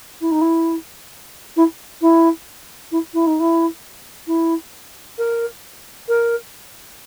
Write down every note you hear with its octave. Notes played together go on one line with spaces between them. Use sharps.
E4
D#4
E4
E4
E4
E4
E4
D#4
E4
E4
A#4
A#4